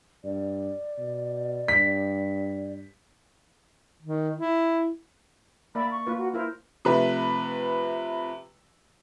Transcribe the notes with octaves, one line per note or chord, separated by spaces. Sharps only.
G2 D5
B2
G2 B6
D#3
E4
A#3 D5 E5 B5
C#6
A#3 F4 B4
F#4
E4 F4 A#4 C5
C3 F3 A3 B4